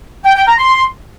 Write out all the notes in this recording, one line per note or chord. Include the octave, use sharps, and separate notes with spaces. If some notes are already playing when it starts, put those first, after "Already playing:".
G5
G5
A#5
C6